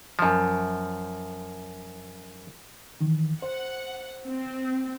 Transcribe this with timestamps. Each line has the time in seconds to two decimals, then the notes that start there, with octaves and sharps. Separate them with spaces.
0.19 F#2 F3
3.01 D#3 E3
3.42 C5 F#5
4.27 C4